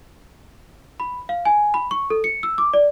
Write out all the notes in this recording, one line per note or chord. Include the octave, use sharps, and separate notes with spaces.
B5
F5
G#5
B5
C#6
A4
C#7
E6
D6
D5